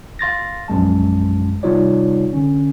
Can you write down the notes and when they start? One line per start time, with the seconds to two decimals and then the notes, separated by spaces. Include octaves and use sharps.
0.19 F5 C6 A6 A#6
0.68 A#1 F#2 G#3 A5
1.63 C3 G3 D#4 F4 C#5 D5
2.33 D3 C#4